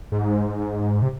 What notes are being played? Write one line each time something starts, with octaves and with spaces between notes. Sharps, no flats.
G#2
C3